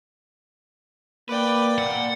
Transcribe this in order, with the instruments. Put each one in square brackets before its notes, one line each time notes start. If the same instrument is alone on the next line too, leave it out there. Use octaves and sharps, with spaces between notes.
[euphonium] A#3 [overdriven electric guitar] B4 [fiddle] D5 G5
[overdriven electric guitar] A#2 [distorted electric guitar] F#5